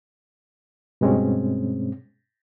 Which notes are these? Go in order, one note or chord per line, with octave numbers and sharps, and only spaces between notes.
G2 B2 G#3 C4 C#4